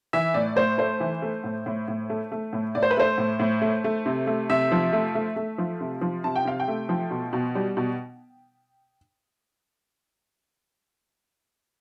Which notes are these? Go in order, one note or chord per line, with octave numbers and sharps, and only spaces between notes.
E3 E5
A2 D5
A2 C5
A3 C5
E3
A3
A2
A2
A2
A3
A3
A2
A2 D5
C5
B4
A3 C5
A2
A2
A3
A3
C3
A3
C3 E5
F3
A3
A3
A3
F3
C3
F3
C3 A5
G5
C3 F5
G5
A3
F3
B2
B2
G3
B2